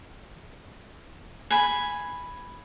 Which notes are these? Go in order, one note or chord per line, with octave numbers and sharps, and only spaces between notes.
G#5 B5